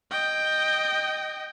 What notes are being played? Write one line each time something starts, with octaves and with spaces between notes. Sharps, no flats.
D#5 G5